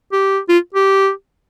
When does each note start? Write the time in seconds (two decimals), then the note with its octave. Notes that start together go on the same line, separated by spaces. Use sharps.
0.12 G4
0.49 F4
0.75 G4